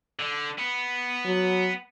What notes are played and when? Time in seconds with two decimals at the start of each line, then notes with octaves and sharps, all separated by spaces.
0.19 D3
0.59 B3
1.26 F#3